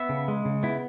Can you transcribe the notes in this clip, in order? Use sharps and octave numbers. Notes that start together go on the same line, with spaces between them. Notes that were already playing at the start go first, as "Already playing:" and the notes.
Already playing: B3 E5
C#3
G#3
C#3
B3 E4